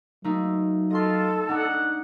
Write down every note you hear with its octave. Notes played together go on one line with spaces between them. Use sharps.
F#3 A3 A#3 D#4
F4 A4 D#5 C6
D4 D#4 F#5